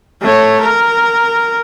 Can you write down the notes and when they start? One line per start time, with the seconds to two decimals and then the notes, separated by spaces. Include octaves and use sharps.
0.22 A3 C#5
0.61 A#4